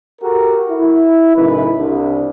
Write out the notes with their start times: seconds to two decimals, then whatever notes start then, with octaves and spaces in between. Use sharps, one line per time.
0.22 F#4 G4 A4 A#4
0.70 E4
1.35 F#2 A2 C#3 D#4 E4 B4
1.78 C2 D4